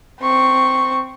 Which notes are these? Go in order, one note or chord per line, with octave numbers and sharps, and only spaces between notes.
C4 C#6